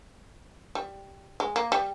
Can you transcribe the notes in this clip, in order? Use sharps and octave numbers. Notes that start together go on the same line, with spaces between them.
G3
G#3
A#3
G3